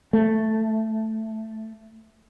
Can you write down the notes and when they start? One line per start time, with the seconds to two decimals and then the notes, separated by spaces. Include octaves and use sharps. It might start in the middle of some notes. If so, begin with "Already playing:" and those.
0.13 A3